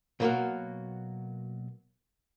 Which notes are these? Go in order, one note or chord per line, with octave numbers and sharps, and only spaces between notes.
B2 F#3 A#3 B3 F#4 A#4